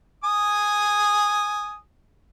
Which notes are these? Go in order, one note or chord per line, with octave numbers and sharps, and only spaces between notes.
G#5 D#6